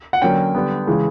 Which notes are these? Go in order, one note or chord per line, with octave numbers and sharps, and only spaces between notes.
F#5
D3 F#3 A#3 C#4 G5
D3 G3 B3
C#3 E3 G#3